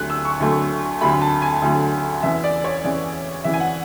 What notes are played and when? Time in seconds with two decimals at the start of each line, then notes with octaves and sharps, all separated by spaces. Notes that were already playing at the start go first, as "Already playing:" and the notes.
Already playing: D2 D3 F#3 A3 F#6
0.10 E6
0.25 C#6
0.40 D2 D3 F#3 A3
1.01 D2 D3 F#3 A3 B5
1.22 A5
1.42 G#5
1.62 D2 D3 F#3 A3
2.23 E2 C#3 E3 E5
2.44 D5
2.64 C#5
2.84 E2 C#3 E3 D5
3.44 E2 C#3 E3 E5
3.54 G#5
3.60 F#5